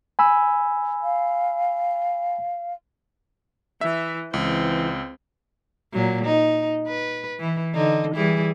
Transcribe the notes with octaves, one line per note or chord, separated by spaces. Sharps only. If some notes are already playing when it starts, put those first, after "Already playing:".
G#5 B5 E6
F5
E3 E5
C#2 E3 C4
A#2 F#3
D#4
B4
E3
D3 D#4
E3 G3 G#4